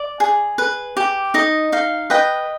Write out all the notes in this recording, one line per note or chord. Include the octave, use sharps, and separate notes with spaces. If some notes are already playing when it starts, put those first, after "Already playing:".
Already playing: D5
G#4
B4
G4
D#4 D#5
D#4 F5
B4 D#5 G5